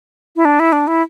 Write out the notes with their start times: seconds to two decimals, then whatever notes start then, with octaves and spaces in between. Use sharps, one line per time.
0.36 E4
0.45 D4
0.60 E4
0.72 D4
0.87 E4